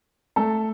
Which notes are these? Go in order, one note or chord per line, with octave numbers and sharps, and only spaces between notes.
A3 A4